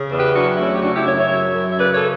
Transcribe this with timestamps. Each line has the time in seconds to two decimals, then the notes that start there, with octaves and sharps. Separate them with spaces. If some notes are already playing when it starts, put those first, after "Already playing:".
Already playing: C#3
0.09 E2
0.17 G4 B4
0.33 F#3 D4 F#4
0.57 A3 C#4 E4
0.75 G4
0.81 C#3 D4 F#4
0.94 E4 G4
1.05 F#2 C#5 E5
1.17 C#5 E5
1.29 F#3
1.53 F#2
1.71 E5
1.77 C#3 B4 D5
1.93 A4 C#5